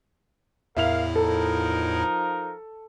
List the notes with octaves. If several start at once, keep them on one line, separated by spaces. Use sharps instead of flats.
E2 A2 E4 A#4 E5 F5 F7
F3 D#4 A4 A#4